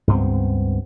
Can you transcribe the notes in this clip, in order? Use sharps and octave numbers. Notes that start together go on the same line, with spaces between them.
C#2 G2 B3 C4